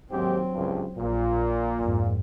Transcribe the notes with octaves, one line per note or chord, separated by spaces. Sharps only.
D#2 G#2 F#3 C4 G4
C#2 G2
A#1 A#2
F2 G#2